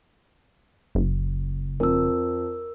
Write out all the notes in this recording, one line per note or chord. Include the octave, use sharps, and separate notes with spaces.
F#1
F2 A#4 E6